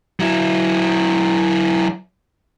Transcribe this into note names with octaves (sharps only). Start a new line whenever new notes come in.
F#3 E4